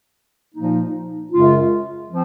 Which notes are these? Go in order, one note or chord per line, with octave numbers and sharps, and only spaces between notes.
A#2 F3 A#3 D#4
F#2 C#3 G#3 C#4 F4
F3 C4